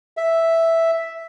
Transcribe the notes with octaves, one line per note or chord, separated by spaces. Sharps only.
E5